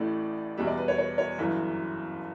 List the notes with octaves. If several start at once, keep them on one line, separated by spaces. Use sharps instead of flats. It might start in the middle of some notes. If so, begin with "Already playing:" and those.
Already playing: A1 A2 E3 A3 D5
E2 B2 G3 E5
D5
B4
C#5
C#5
C#5
G1 F#2 E3